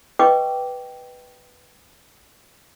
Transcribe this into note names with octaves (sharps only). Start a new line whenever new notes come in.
B4 D#5 G5 C#6 D6